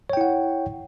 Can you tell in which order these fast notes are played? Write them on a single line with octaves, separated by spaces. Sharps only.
C#5 G5 E4 F#5